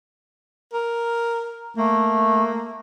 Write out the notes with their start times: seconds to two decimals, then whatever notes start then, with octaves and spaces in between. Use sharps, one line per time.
0.73 A#4
1.77 A3 A#3